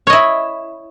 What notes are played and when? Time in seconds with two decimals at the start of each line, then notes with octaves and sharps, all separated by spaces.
0.07 C#5
0.10 D#5
0.13 E4